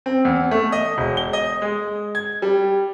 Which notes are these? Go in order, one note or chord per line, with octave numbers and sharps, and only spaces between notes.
C4
E2
A3
D#5
E1
G7
D#5
G#3
G#6
G3